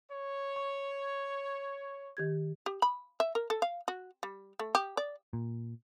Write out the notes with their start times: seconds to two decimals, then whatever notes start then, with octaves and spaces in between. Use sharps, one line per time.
0.12 C#5
0.56 C#6
2.17 D#3 G4 G#6
2.66 G4
2.82 B5
3.20 E5
3.35 A#4
3.50 A4
3.62 F5
3.88 F#4
4.23 G3
4.59 A3
4.75 G4
4.97 D5
5.33 A#2